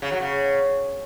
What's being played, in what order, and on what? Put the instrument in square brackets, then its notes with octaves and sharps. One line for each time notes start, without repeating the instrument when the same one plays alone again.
[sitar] C#3
F#3
C#3